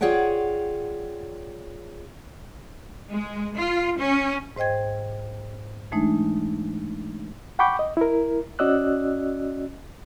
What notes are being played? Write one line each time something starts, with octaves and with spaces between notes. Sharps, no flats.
F4 G#4 C#5 D5 F#5 G5
G#3
F4
C#4
G#2 C5 D#5 G5 G#6
E3 G#3 A3 D4 D#4
F#5 G5 B5 C#6 D6 G6
D#5
E4 A#4
C#4 F#4 D5 D#5 E6 F#6